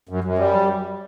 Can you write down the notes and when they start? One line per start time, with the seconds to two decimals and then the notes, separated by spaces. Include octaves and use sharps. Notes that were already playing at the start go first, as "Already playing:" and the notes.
0.09 F#2
0.24 F#2
0.39 G3